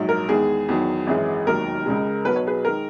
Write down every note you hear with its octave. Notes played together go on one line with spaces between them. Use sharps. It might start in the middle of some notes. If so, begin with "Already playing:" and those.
Already playing: A#1 G#2 F#3
A#4
E2 D#3 G#3 G#4
E2 D#3 F#3
G#1 F#2 E3 G#3
E1 D#2 D#3 F#3 A#4
C#2 C#3 G#3
B1 B2 F#3 B4
C#5
G#4 B4
D#3 G#3 A#4